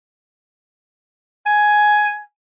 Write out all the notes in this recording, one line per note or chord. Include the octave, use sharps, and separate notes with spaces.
G#5